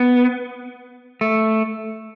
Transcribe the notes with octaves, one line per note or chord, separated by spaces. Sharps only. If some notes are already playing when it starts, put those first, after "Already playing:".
Already playing: B3
A3